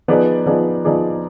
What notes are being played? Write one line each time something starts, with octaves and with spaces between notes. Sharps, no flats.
F3 B3 D#4 G#4 D5
F3 B3 D#4 G#4 D5
F3 B3 D#4 G#4 D5